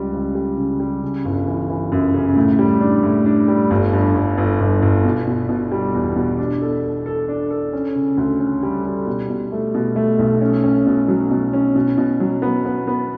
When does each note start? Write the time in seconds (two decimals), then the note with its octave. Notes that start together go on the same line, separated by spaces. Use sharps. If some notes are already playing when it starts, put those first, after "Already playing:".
Already playing: C#2 G3
0.13 C#2
0.35 G3
0.57 C#3
0.80 G3
1.02 C#3
1.25 G1
1.47 E3
1.69 E3
1.92 F#2
2.14 C#3
2.36 A2
2.59 G3
2.81 D4
3.03 A2
3.26 D4
3.48 G3
3.71 G1
3.93 G2
4.15 G1
4.38 G1
4.60 G1
4.82 G1
5.05 B2
5.27 B2
5.49 B2
5.72 G3
5.94 E2
6.16 B2
6.39 D4
6.61 A4
6.84 A4
7.06 A4
7.28 D4
7.51 A4
7.73 C#4
7.95 C#3
8.17 D2
8.40 C#4
8.63 G3
8.85 G3
9.07 B2
9.29 B2
9.52 A3
9.74 B2
9.96 A3
10.19 B1
10.41 C#4
10.64 C#4
10.86 B2
11.08 F#3
11.31 B2
11.53 C#4
11.75 B2
11.98 B2
12.20 F#3
12.42 B3
12.65 B3
12.87 B3